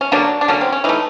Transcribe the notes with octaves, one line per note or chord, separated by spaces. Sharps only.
C#4
D3 F#3 A#3 D4
D4
D3 F#3 A#3 C#4
C4
C#4
E3 A3 D#4